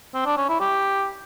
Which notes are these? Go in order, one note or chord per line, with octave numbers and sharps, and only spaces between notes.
C4
D4
C#4
E4
G4